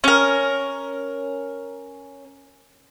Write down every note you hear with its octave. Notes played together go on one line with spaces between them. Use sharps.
C#4 A#4